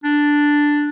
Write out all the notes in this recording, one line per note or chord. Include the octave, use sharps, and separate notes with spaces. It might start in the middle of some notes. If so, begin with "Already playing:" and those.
D4